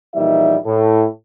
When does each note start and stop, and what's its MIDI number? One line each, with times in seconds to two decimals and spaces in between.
0.15 0.57 34
0.15 0.57 52
0.15 0.57 55
0.15 0.57 58
0.15 0.57 63
0.15 0.57 76
0.66 1.06 45